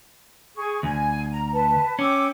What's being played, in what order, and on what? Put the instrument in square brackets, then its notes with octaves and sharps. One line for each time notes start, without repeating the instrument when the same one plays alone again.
[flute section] G#4 C#6
[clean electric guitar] D2 [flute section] G#5
[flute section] A#5
B4 A5
[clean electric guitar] C#4 [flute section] G5 D6 E6